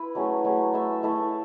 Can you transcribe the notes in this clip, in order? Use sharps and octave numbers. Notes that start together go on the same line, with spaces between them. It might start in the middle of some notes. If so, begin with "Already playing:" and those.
Already playing: E4 B4
F#3 A3 C#4 G#4
F#3 A3 C#4 G#4
A3 E4 A4 E5
A3 E4 A4 E5